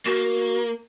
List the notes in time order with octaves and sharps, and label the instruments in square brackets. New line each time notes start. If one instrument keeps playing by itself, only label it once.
[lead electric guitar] A#3 [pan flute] F#4